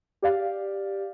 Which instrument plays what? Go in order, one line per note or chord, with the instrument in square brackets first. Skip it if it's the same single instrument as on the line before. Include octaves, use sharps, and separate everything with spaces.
[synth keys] G4 D5 F5